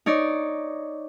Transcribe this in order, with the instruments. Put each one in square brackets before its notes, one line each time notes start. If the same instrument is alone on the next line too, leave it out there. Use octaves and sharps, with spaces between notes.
[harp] D#4 C#5 D5